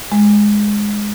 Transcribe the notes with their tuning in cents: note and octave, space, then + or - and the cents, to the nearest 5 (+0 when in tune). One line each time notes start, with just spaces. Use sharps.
G#3 +0